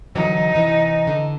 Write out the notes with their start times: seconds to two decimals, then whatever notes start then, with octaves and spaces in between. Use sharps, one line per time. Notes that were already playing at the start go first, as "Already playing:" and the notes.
0.16 D3 E3 F#3 D#4
0.54 C3 E3
1.07 D3